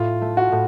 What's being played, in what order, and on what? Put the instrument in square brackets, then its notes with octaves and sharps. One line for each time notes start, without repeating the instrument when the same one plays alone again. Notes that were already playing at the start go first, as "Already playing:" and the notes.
Already playing: [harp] A2 [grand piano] F4
[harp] A3
[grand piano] F#4
[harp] A2